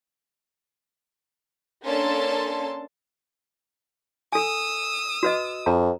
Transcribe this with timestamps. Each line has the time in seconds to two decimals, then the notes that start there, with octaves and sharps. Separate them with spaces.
1.85 A#3 C#4 D4 A4 A5 C6
4.33 A4 G#5 D#6 E6
5.23 F#4 B4 D#5
5.66 F2 A#5